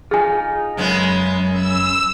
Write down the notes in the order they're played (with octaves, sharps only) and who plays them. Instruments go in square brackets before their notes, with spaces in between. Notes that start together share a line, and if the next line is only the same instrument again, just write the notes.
[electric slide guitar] D#4 F4 [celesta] G#4 G#5
[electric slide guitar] F#2 [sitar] C#3 G#3 B3
[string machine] E6